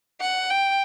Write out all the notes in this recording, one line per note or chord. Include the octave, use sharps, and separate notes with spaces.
F#5
G5